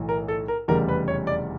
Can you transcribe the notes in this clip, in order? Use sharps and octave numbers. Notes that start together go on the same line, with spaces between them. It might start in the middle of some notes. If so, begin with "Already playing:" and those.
Already playing: B1 A2 E3
A#4
A4
A#4
F1 E2 C#3 E3 G3 A#4
B4
C#5
D5